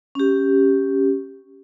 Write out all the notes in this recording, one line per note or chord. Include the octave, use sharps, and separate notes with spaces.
C#4 G4